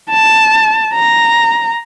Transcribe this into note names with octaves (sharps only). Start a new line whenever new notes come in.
A5
A#5